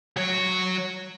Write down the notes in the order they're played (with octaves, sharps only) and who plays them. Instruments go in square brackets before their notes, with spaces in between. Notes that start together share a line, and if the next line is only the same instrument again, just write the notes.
[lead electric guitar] F#3 C#5